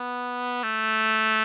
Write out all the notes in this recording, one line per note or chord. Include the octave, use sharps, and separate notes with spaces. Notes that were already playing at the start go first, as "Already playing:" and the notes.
Already playing: B3
A3